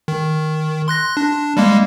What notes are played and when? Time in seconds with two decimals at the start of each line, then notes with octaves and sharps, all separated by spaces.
0.08 D#3
0.88 C6 F#6 A#6
1.17 D4
1.57 G3 G#3 A#3